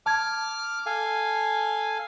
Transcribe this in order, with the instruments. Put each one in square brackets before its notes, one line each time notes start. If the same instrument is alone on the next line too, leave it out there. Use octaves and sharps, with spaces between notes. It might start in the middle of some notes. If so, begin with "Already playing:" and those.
[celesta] A5 G#6 [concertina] D6 F6
[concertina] A4 F5 G#5